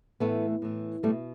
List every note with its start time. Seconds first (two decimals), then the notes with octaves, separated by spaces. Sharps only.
0.20 A2 E3 A3 B3
0.62 A2 E3
1.03 B2 G3 A3